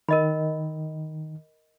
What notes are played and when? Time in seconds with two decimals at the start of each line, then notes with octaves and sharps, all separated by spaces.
0.09 D#3 A#4 D#5 B5